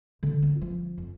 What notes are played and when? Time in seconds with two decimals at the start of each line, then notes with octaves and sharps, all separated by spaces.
0.23 D3
0.42 C4
0.61 F3
0.98 F2